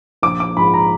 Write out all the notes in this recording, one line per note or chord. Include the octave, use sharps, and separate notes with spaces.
A#1 D6
D6
G#2 F3 B5
A#5